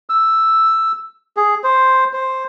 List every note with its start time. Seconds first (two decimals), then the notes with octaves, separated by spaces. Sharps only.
0.10 E6
1.37 G#4
1.64 C5
2.13 C5